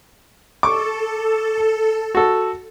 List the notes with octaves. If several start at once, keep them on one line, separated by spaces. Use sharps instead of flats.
A4 C#6 D6
F#4 A4